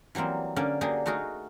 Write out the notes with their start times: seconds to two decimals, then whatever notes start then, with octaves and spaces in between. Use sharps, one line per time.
0.15 E3 F#3 G3 A#3 C4
0.56 D3 A#3 C#4 D5 F#5
0.81 D3 F#3 A#3 D4 G4 G#4
1.06 A3 D#4 F#4 G#4 A#4